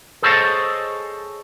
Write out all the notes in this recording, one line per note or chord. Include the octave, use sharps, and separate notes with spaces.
G#4 A4 C5 C#5 D#5 A5